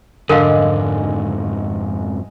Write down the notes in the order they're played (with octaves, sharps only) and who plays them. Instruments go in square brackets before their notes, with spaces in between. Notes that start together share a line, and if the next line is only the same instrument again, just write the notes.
[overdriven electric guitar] F2 G#2 [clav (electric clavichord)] D3 [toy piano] A#4 F5 [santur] D#5 F#5 G#5